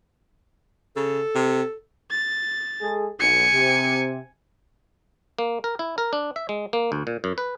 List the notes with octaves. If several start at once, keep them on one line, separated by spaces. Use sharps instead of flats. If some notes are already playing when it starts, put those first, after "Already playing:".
C#3 A4
C3
A6
G#3 G#4 A4
B1 G#5 C#7
C3
A#3
A#4
E4
A#4
D4
E5
G#3
A#3
D2
A#2
F#2
B4